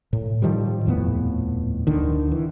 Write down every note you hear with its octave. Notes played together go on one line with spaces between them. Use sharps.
A2
A2 D#3 F3 G3
D#1 F2 A2 B3
D2 D3 D#3
E3